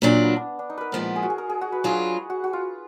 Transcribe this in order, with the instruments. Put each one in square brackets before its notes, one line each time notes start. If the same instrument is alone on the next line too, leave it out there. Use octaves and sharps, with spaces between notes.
[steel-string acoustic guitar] A#2 F#3 D4
[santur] B3
D4
D4
D#4
A#4 B4
[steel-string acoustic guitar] A#2 F3 G#3 B3 [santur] A#4
[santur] G#4
F#4
G#4
A#4
G#4
F#4
B4
[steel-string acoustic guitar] F#3 D4 F4 [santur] G#4
[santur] F#4
F#4
F4